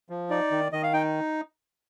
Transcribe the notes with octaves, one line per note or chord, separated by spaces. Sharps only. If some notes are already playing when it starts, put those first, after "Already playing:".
F3
D#4 D5
D#3
D#3 D#5
F5
D#4 G5